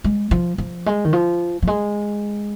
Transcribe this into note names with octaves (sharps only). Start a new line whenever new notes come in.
G#3
F3
F3
G#3
D#3
F3
F3
G#3